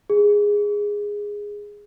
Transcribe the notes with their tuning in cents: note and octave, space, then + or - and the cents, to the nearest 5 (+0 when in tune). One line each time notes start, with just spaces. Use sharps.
G#4 -10